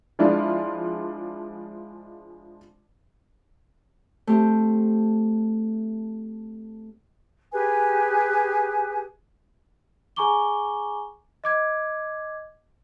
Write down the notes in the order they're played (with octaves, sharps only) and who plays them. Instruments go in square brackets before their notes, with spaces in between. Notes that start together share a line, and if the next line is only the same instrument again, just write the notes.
[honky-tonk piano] F3 G#3 D4 E4 F4
[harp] A3 C4 G4
[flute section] G4 G#4 B4 G#5
[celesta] G#4 G#5 A#5 C#6 D6 G7
D#5 D6 G#6